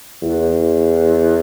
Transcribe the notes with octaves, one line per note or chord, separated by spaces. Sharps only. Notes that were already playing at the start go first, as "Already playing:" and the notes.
E2